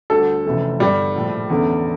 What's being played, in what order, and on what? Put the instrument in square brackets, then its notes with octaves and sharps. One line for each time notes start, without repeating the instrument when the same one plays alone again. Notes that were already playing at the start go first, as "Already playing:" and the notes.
[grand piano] D2 D3 G3 [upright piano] A4
[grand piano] F1 F2 E3 A3 C#4
[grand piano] G1 G2 D3 [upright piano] G3
[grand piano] A#1 A2 F3
E2 D3 A3 C#4